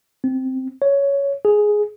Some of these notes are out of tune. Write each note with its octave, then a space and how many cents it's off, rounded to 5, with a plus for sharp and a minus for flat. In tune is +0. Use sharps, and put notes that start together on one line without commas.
C4 -5
C#5 +10
G#4 +5